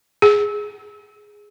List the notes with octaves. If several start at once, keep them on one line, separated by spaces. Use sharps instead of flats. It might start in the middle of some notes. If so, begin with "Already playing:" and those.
G#4